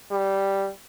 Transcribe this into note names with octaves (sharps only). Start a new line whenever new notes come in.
G3